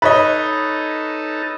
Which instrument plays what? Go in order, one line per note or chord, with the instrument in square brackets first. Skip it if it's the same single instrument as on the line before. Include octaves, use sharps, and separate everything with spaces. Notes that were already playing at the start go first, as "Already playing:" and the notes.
[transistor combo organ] D#4 A4 [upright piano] B4 C#5 D#5